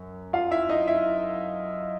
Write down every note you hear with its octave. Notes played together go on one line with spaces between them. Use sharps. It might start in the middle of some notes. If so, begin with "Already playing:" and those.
Already playing: F#2
F4 F5
E4 E5
D#4 D#5
E4 E5